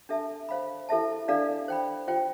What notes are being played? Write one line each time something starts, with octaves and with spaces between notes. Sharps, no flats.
D4 A4 E5 A5
C5 F5 B5
E4 A4 E5 A5
D4 A4 D5 F5
C5 G5 B5
F4 C5 G5